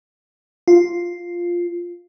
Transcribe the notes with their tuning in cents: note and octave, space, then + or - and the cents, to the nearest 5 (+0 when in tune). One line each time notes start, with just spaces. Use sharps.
F4 +0